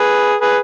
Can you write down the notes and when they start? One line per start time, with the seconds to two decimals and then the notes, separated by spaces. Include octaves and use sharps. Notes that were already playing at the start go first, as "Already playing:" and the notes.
Already playing: G#4 B4
0.41 G#4 B4